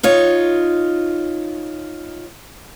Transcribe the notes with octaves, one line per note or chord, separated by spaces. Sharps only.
D#4 F4 C#5